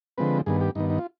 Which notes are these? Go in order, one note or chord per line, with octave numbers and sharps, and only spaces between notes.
D3 F3 G#3 C4 B4
G2 D#3 B3 G#4
G4
G2 D#3 B3 D#4
D#4
F4